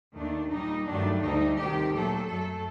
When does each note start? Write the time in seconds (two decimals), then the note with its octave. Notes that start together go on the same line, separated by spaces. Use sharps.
0.15 D#2 D#3 A3 D4
0.51 A#2 G3 D#4
0.87 G2 D#3 F#3 A3 D4
1.22 D2 D3 G3 D#4
1.58 D2 C3 D#3 G3 G4
1.93 A#2 F#3 A3 A4
2.28 F#2 F#3 A3 A4